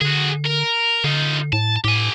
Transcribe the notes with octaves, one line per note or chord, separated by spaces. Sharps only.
D3 F#4 G#4
A#4
D3 D#4 F4
A2 A5
A2 G4 G#5